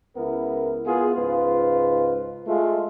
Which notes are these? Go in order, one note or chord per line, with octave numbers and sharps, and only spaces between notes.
C#2 B3 E4 A#4
B3 F4 G#4
C#2 G#2 F4 B4
G#3 A3 F4